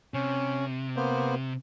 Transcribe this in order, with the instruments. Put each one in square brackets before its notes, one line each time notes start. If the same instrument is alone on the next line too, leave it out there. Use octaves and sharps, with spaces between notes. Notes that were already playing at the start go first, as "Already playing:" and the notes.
[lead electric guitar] C3 [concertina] C#4
[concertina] A#3 B3 C5